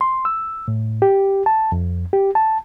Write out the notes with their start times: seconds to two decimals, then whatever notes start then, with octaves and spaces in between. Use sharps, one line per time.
0.01 C6
0.25 E6
0.68 A2
1.02 G4
1.46 A5
1.72 F2
2.13 G4
2.35 A5